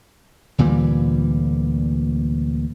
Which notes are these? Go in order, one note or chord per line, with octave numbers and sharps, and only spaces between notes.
D2 A#2 E3 G3